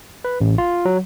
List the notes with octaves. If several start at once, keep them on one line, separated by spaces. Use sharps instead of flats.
B4
A1
F4
F#3